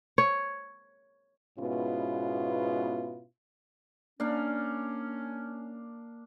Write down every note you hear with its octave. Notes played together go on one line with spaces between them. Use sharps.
C#5
G#2 B2 B3 C#4 E4 F4
A#3 C#4 D4 F5